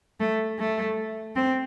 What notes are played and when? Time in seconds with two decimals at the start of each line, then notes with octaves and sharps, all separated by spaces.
0.20 A3
0.58 A3
1.35 C4